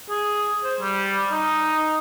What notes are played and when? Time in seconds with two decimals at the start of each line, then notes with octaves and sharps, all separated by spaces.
0.10 G#4
0.64 C5
0.80 G3
1.31 D#4